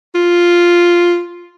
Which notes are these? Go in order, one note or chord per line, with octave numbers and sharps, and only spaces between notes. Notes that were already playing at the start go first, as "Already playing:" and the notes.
F4